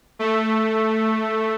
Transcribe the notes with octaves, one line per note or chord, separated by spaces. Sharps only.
A3